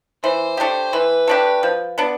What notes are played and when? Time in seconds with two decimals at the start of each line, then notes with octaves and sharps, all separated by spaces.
0.23 E3 C5
0.57 A3 D4 G4
0.93 E3 B4
1.28 A3 D4 G4
1.63 F3
1.98 B3 D4